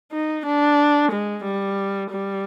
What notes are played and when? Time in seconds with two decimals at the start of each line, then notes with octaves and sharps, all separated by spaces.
0.12 D#4
0.46 D4
1.12 G#3
1.44 G3
2.10 G3